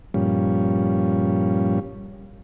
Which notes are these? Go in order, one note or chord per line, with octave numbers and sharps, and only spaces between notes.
G2 A#2 F3 G3 C#4